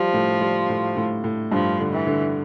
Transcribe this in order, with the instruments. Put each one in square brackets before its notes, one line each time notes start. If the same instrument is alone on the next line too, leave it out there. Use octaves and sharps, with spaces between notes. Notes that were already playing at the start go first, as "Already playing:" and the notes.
Already playing: [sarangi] F3 [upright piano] G3
[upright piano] A2
G3
A2
A2
A2
[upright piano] G2 [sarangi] F3
[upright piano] D3
[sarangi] E3
[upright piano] D3